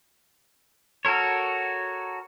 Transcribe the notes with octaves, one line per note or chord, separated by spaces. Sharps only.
F#4 A4 A#4 C#5